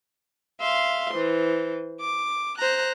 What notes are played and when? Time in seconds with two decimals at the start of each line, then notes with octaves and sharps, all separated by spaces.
0.61 E5 F5 C6
1.13 E3 C5
2.00 D6
2.57 C5 A#5 F#6